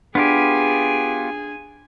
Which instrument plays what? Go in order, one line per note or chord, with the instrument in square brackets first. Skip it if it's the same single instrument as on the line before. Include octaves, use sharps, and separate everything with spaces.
[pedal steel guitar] B3 F4 G4 [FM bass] D4 [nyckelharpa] G#4 G#5